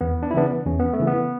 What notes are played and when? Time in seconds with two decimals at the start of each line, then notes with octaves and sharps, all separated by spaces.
0.01 E2 B3
0.23 D4
0.31 E4
0.34 C#3 E3 B3 D4
0.66 E2 C#4
0.80 B3
0.93 A3
1.00 C#3 E3
1.07 B3